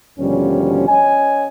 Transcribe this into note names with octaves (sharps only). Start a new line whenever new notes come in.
D#2 B2 D3 F3 G3 C#4
C#4 C#5 D#5 G#5